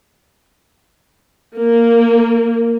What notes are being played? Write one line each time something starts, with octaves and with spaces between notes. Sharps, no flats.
A#3